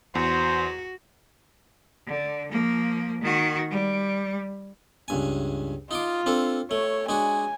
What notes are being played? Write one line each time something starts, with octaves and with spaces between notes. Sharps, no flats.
E2 F#4 C5
D3
F3 A#3
D#3 F#4
G3
C#2 G2 G#5
D#4 F4 C6 D6
C4 D4 A4
A3 C#5
G#3 D4 F#4 G#5